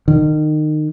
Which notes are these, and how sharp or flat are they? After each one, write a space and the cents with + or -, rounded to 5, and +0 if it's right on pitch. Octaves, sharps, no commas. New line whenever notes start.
D#3 -25